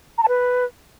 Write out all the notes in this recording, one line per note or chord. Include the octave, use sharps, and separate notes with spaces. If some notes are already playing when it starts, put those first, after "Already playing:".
A#5
A5
B4